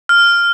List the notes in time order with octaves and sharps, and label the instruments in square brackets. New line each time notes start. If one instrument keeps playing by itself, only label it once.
[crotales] F6